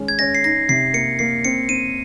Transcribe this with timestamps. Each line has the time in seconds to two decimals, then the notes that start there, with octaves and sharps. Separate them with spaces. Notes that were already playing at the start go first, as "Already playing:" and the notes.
Already playing: D#3 G#3 C#4
0.08 G#6
0.19 C#4 A#6
0.35 C7
0.44 D#4 A#6
0.69 C3 C7
0.94 A#3 C#7
1.19 A#3 C7
1.45 C4 C#7
1.69 C4 D#7